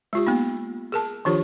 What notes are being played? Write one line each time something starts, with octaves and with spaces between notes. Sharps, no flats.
G#3 F4 G4
A#3 B3 D#4
G#4 A#4 A5
D#3 F3 D4 F4 G4 A#4